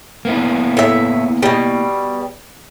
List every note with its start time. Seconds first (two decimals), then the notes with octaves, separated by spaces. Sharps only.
0.25 A#3 B3 E4
0.77 A2 E5
1.43 B2 G3